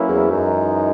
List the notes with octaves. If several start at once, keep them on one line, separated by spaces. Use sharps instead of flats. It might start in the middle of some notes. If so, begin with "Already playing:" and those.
Already playing: F#3 A#3 C#4 E4 B4
E2
F#2 E3 G#3 D#4